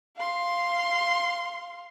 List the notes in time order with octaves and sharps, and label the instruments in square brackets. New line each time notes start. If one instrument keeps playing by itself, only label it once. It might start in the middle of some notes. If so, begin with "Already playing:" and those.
[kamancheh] F5 C6